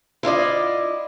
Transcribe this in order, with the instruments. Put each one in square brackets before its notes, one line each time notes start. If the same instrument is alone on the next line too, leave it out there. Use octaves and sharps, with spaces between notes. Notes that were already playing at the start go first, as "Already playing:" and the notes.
[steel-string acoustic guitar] E4 F4 D5 D#5